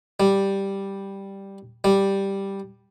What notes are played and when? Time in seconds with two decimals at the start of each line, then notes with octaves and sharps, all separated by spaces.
0.20 G3
1.84 G3